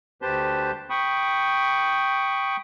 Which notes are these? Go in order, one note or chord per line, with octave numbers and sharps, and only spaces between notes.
D2 G4 B4 C5 A5 G6
G5 B5 C#6 D#6